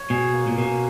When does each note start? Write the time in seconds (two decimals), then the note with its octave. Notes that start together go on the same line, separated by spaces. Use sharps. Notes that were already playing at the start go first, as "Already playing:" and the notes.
Already playing: C#5
0.10 B2 G#4
0.33 A#3
0.47 A#2
0.58 B2 C#4